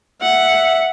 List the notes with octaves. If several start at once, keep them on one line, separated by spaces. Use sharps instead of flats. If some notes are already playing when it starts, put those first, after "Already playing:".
E5 F#5